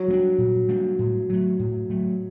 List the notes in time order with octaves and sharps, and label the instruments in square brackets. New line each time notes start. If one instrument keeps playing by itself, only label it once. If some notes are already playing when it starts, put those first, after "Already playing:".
Already playing: [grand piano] F#3
[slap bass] G3 A#3 D4
A#2
G3 A#3 D4
A2
F#3 A3
A2
F#3 A3